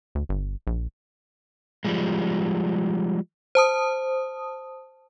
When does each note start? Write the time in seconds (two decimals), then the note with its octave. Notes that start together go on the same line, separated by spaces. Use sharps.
0.15 D2
0.29 G1
0.67 A#1
1.85 F3 G3 G#3
3.55 C5 A5 D#6